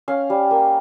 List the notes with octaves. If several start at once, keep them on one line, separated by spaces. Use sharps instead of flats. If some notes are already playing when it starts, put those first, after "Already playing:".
C#4 F5
G3
A#3